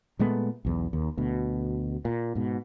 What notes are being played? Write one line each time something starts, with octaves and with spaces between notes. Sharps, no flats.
A#2 G#3 A3 B3
B1 E2
D#2
D2 B2
A#2
G#2 B2